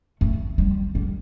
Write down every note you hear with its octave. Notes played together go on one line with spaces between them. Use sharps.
A3
G3
G3